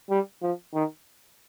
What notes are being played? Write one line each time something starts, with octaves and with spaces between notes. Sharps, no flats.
G3
F3
D#3